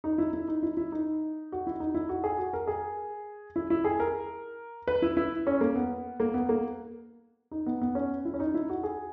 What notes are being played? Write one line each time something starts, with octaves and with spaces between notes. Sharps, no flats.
D#4
E4
E4
D#4
E4
E4
D#4
F#4
E4
D#4
E4
F#4
G#4
F#4
A#4
G#4
E4
E4
G#4
A#4
B4
E4
E4
C#4
A#3
B3
A#3
B3
A#3
D#4
B3
B3
C#4
E4
C#4
D#4
E4
F#4
G#4